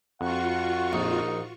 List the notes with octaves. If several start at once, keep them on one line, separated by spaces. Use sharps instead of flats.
F2 F4 F#4 F#5 C#6
A#1 D#4